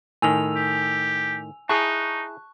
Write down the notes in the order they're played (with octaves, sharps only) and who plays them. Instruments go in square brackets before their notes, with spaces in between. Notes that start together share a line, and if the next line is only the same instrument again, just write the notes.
[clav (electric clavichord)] A2 D#3 [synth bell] G#5 E6 F7
[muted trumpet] G4
[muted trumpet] D#4 [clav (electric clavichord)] E4 G#4 [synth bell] A5 C#6 F#6